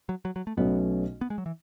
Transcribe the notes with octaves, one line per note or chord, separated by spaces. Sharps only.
F#3
F#3
F#3
A3
B1 B2 A3 B3 C#4
B3
G#3
F#3
E3